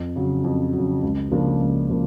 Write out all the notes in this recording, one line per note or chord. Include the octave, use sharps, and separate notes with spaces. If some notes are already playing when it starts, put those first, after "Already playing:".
Already playing: F2
C#3 F#3
F2
C#3 F#3
C#2
C#3 F3 A#3 D4
C#2
C#3 F3 A#3